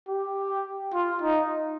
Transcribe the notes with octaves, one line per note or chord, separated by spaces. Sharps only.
G4
F4
D#4